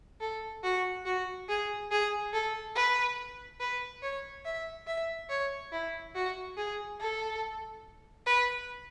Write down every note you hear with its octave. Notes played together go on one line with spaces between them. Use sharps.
A4
F#4
F#4
G#4
G#4
A4
B4
B4
C#5
E5
E5
C#5
E4
F#4
G#4
A4
B4